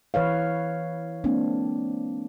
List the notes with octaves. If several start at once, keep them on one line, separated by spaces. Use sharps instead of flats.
E3 B4 C#5 F5
G#3 A#3 C4 D4